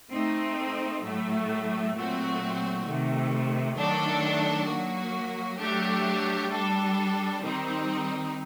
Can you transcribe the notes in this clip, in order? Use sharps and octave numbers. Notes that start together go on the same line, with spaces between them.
A3 C4 D#4
A2 F#3 A3
A#2 F#3 A3 C4 F#4
C3 D#3 A3
D#3 F#3 A3 D4 A4
F#3 A#3 F#4
F#3 A3 D4 G4
G3 D4 A4
D#3 G3 C4 D#4